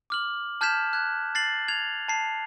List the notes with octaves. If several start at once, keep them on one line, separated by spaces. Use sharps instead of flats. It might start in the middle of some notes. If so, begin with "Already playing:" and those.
D6 F6 F#7
A5 F6 G6 G#6 B6 E7
F#6 G#6
A6 C7 F#7
G#6 F7
A5 C7